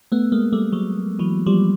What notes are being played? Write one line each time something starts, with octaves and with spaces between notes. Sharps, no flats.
A3 B3
G#3 A#3
G3 A3
F#3 G#3
E3 F#3
F3 G3